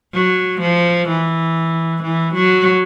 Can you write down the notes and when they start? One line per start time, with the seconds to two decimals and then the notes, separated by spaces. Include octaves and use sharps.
0.13 F#3
0.61 F3
1.09 E3
2.03 E3
2.34 F#3